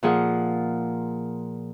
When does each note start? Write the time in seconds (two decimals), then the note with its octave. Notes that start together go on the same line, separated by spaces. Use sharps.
0.03 A#2 F3 G#4 F#5